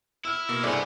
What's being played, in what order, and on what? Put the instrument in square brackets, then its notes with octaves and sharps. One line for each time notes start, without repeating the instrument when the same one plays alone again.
[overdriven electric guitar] E4 [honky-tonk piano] E6 F6
[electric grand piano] B2 A#3
[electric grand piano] C2 G2 [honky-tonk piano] E4 G#4 C5 [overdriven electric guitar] B4 F#5 [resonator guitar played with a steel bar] D5